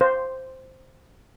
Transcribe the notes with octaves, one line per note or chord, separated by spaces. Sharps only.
C5